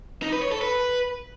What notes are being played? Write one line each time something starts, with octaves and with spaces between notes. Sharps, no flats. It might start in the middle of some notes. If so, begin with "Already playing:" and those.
D#4
B4
C#5
A4
B4